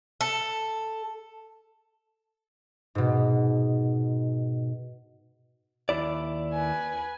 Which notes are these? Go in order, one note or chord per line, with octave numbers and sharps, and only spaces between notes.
A4
G#2 B2
D#2 E4 D5
B4 G#5